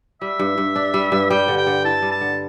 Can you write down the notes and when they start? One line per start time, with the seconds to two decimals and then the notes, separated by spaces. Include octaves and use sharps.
0.21 G3 E5
0.39 G2
0.58 G2
0.76 D4
0.94 G3
1.12 G2
1.30 G3 G5
1.48 D3
1.58 G5
1.67 D3
1.84 E4 A5
2.02 G3
2.12 A5
2.21 D3